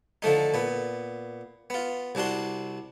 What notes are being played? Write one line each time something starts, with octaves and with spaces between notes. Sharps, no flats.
D3 F3 A3 D#4
A#2 B3
B3 F4
C2 C3 D4 F#4 C6